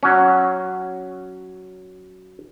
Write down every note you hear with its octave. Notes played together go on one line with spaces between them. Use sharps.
F#3 C#4